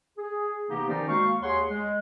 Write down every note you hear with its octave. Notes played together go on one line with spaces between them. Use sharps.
G#4
C3 E3 A#3 B3 D#4 G4
D#3 F3 C#4 D#4 C5 D5
G#3 A#3 F#4 F5 C#6
D#2 G#4 C#5 F#5 C6
G#3